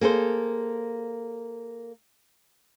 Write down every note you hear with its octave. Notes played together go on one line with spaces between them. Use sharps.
A#3 G#4 A4 C5